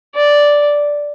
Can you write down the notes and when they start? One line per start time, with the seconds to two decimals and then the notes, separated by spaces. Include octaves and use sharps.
0.16 D5